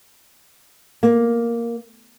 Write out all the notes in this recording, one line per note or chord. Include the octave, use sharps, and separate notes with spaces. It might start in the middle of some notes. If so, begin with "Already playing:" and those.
A#3